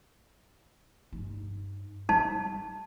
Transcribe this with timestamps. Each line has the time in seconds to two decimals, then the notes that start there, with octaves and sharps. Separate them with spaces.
1.12 G2 D#4
2.09 G3 D#4 A5